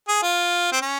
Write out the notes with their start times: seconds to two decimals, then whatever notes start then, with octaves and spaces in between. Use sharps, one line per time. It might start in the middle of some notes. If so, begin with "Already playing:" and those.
0.08 G#4
0.22 F4
0.72 C4
0.82 C#4